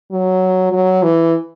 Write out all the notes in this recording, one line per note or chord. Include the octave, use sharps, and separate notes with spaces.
F#3
F#3
E3